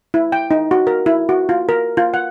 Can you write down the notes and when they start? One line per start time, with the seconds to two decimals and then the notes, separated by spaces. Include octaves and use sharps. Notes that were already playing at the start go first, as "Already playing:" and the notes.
0.14 E4
0.32 G5
0.51 D#4
0.71 F#4
0.87 A#4
1.06 E4
1.29 F#4
1.49 F4
1.69 A#4
1.97 F4
2.14 F#5